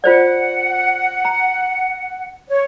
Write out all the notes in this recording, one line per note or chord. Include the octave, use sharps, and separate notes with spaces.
F4 C5 D5 F#5
A#5
C#5